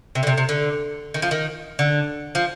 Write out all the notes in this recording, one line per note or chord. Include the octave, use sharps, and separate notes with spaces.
C3
D3
C3
C3
D3
D#3
F3
D#3
D3
F3